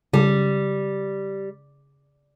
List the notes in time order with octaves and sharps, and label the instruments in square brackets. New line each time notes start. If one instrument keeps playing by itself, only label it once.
[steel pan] C#3 [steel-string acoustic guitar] G3